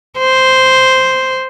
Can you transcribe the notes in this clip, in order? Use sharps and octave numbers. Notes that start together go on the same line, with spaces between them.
C5